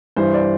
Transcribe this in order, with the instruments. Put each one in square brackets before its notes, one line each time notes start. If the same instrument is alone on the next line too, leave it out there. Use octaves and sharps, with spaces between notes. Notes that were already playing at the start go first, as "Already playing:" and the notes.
[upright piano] G2 E3 C5
D5